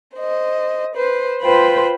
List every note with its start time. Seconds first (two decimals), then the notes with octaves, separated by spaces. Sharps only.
0.15 C5 D#5
0.94 B4 C5
1.42 F4 B4 C5 G5 B5